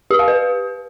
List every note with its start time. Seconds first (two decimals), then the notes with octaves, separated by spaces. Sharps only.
0.11 G4
0.19 F5
0.28 B4